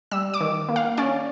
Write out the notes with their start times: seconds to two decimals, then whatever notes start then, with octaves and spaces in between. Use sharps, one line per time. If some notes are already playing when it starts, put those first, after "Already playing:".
0.11 G3 E6
0.34 D6
0.41 D#3
0.69 A#3
0.76 F5
0.97 C#4 D5